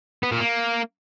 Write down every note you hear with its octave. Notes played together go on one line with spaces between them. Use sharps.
B3
A#2
A#3